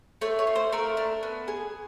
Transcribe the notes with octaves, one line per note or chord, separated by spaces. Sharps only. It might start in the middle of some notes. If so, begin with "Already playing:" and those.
A3 C#5
C#5
F4
C5
A3 A#4
D4
B3
G#4